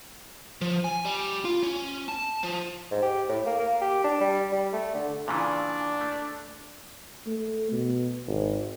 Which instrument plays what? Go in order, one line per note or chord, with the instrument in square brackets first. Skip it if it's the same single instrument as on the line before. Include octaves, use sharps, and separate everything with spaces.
[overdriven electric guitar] F3
G#5
G3
F4
C#4
A5
F3
[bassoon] G#2
G4
A2
A#3
A#3
G4
D4
G3
G3
A3
D3
[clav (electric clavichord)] A#2 C#3 E3 [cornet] D4
[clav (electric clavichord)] A3
[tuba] A3
B2
G#1